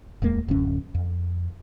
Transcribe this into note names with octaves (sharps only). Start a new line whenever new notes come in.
D1 E2 G#3 A#3
D1 F#2 D3 C#4
F2